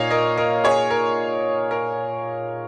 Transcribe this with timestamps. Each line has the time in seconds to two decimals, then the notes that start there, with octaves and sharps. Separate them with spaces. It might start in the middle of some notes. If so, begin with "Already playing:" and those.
Already playing: A#2 A#3 D#4 C#5 D#5 F5 G#5
0.11 A#4 D#5
0.37 A#4 D#5
0.64 G#4 C#5
0.91 A#4
1.71 A#4